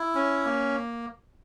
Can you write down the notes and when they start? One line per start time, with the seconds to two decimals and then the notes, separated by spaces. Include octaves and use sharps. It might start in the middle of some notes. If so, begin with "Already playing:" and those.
Already playing: E4
0.15 C#4
0.45 A#3